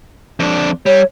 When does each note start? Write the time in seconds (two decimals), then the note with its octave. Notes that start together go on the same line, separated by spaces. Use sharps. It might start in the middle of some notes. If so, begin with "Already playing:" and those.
0.40 F2 D4
0.86 G3 C#5